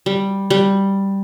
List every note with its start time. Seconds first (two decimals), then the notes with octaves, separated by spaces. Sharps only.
0.06 G3
0.50 G3